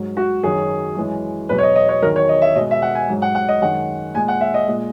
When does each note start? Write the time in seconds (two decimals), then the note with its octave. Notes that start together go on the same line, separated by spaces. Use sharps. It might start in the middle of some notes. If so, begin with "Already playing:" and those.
Already playing: G#2 F#3
0.17 F#4
0.43 F#2 D#3 F#3 G#4
0.96 F#2 E3 G#3
1.49 E2 B2 F#3 B4
1.58 C#5
1.63 D#5
1.76 D#5
1.89 C#5
2.02 E2 D#3 F#3 A#4
2.16 C#5
2.29 D#5
2.42 E5
2.56 B2 D#5
2.59 G#3
2.71 E5
2.82 F#5
2.95 G#5
3.09 G#2 F#3
3.22 F#5
3.35 F#5
3.48 D#5
3.62 F#2 D#3 G#3 F#5
4.14 A#2 G#3 G#5
4.28 F#5
4.41 E5
4.54 D#5
4.67 A#2 G#3